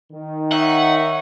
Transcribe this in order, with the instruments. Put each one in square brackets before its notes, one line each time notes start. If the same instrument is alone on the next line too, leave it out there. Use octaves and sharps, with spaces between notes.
[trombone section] D#3
[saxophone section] D#4 C#5 E5 [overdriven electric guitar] F#5